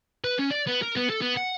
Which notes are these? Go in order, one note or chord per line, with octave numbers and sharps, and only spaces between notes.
B4
C#4
D5
B3
A#4
B3
A4
B3
F#5